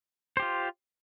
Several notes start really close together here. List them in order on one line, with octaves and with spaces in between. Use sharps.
C5 G4 F4